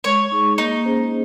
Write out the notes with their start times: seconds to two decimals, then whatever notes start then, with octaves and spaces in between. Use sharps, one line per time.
0.04 G#3 C#5
0.32 D#4 G#4
0.58 A#3 D#4
0.85 C#4 G#4 C5